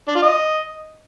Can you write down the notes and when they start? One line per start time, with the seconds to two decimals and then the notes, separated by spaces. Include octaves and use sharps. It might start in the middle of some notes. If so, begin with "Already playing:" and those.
0.08 D4
0.15 F4
0.23 D#5